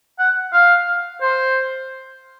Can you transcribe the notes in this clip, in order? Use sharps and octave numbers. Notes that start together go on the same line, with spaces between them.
F#5
F5
C5